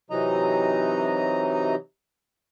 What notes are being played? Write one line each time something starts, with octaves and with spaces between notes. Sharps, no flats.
C3 E3 F#3 D#4 D#5 A#5